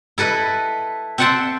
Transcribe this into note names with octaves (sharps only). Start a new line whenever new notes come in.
E4 A4 B4 D#5
C4 E5 F#5 G5 A5 C6